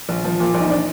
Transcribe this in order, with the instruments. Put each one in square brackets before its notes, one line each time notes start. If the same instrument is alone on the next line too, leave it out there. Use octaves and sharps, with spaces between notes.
[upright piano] A#1
F3
A#2
A#1
D#4
D4